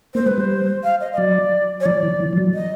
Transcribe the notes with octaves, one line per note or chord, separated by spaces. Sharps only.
A#3 C5
G#3 B4
G3 C5
F5
D#5
D#5
F#3 D5
C#5
F3 D5
E3
E3
F3
F#3
D#5